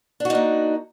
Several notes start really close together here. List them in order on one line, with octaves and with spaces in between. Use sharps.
D4 F#4 D#4 A#3